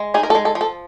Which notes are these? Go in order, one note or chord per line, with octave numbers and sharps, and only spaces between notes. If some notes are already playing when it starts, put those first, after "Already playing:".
Already playing: G#3
D#4 G#4
A#4
A4
G#3
A4
F3
A4